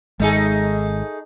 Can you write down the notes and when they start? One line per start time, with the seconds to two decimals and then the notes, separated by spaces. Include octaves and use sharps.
0.20 G#1 G#3 A3 D#4 G#4